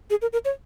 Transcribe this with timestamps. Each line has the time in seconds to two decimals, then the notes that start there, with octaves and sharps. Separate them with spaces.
0.10 G#4
0.22 A#4
0.33 A#4
0.45 C#5